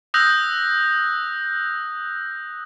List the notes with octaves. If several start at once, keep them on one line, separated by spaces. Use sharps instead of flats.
D#6 E6 F#6 G6 A#6